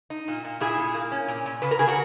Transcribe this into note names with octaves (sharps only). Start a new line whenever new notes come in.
D#4
A#2
A#2
A#2 E4 G#4
A#2
A#3
C#4
A#2
A#2
C#3 B4
A#4
C#3 G#4
F#4 A#4